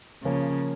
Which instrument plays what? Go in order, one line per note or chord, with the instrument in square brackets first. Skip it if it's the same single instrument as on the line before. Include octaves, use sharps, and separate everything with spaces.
[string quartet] C#3 [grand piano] F3 A#3 C#4